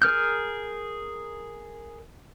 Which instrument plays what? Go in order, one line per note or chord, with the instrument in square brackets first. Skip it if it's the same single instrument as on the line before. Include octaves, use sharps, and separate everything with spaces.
[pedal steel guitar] G#4 A#4 F6 G6